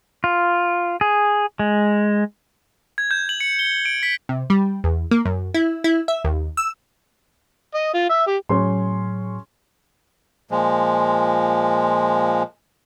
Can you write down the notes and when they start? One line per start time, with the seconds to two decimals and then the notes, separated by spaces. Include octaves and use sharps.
0.24 F4
1.01 G#4
1.59 G#3
2.98 G#6
3.11 G6
3.29 F#7
3.41 C#7
3.59 G7
3.85 D7
4.03 B6
4.29 C3
4.50 G3
4.84 E2
5.11 A#3
5.25 F#2
5.54 E4
5.84 E4
6.08 E5
6.24 D#2
6.57 E6
7.74 D#5
7.94 F4
8.09 E5
8.26 G4
8.49 A2 F#3 C#4 G#4 C6
10.51 A#2 F3 G#3